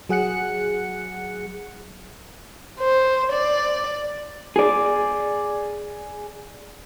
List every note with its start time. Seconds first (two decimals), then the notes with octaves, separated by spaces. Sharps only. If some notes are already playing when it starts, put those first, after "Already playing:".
0.09 F#3 G#4 F#5 F#6 C#7
2.80 C5
3.32 D5
4.56 G#4 D5